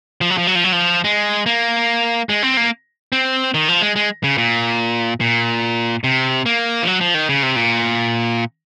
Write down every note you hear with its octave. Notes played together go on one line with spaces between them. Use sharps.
F3
F#3
F3
F#3
F3
F#3
F3
G#3
A#3
G#3
C4
A#3
C4
D#3
F3
G#3
G#3
C#3
A#2
A#2
C3
A#3
F3
F#3
F3
D#3
C#3
C3
A#2